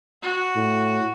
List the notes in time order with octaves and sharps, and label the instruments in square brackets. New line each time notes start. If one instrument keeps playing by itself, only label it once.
[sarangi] F#4
[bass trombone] A2